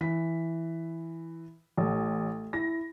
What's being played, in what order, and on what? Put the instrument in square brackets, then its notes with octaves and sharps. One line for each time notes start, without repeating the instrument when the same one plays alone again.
[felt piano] E3 B6
[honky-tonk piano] A1 [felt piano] A3
[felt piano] E4 [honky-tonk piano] A#6